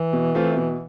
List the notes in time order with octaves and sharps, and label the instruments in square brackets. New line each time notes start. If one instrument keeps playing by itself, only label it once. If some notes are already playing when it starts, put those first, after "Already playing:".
Already playing: [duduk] E3
[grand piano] B2
A3 C4 F4
B2